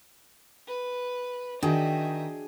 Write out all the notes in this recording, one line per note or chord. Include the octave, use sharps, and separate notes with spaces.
B4
D#3 D4 F#4 G#4 D#5 E5 G5